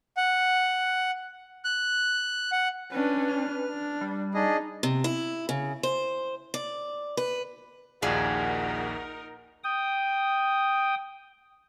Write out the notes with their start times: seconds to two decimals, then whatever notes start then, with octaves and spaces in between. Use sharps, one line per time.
0.17 F#5
1.65 F#6
2.52 F#5
2.92 C#4 D4 B4
3.28 F6
3.70 D4
4.01 G3
4.34 D4 D#4 G#4 D#5
4.83 C3
5.04 E4
5.49 C#3
5.83 C5
6.54 D5
7.17 B4
8.02 A#1 D#2 D#4 F4 F#4 G#4 A#4 D5
9.64 G5 D#6